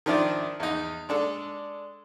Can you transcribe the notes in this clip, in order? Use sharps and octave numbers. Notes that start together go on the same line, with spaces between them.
D#3 F3 D4 E4 D5
E2 D#4
G#3 D4 A4